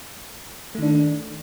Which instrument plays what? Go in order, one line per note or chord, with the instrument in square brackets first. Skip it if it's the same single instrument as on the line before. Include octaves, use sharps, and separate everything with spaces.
[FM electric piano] A3
D#3
D4